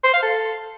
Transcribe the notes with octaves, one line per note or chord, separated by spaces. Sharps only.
C5
F5
A4